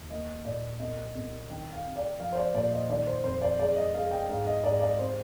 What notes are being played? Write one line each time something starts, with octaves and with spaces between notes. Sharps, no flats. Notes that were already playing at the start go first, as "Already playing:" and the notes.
Already playing: D#2
A#3 D#5
A#2 D5
C2 D#5
C2
D#3 G5
F5
C3
D5
F3 F5
C5
D5
A#2 D5
D#5
D#3 D5
C5
F2 C5
D5
G#3 D5
D#5
G#3 F5
G5
G#2 F5
D#5
G#2 D5
D5
C3 C5